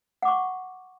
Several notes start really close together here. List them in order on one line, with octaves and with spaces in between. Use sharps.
F#5 D6 C#6